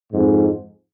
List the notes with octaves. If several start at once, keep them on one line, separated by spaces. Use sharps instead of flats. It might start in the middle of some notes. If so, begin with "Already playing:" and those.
F2 G#2